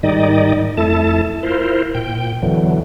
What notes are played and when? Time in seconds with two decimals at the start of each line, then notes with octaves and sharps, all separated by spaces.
0.03 G#2 D#3 G3 D#4 D5 D#5
0.77 F2 A3 E4 A4 A5
1.43 E4 F4 A#4 C5
1.95 A#2 G5
2.42 E2 D3 E3 F#3